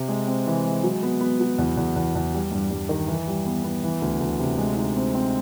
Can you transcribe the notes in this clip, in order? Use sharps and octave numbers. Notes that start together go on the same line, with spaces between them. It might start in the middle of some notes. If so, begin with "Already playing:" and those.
Already playing: C3
G#3
C4
E3
G#3
F#3
B3
B3
F#3
E2
E2
E2
E2
G3
G2
G2
D#3
E3
G3
B3
B3
E3
D2
D2
C3
G#3
D#4
C4
C4